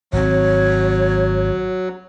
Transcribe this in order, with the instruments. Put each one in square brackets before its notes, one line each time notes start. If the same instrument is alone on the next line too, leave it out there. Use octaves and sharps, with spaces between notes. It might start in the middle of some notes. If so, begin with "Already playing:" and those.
[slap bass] G#1 C4 [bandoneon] F#3 [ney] C#5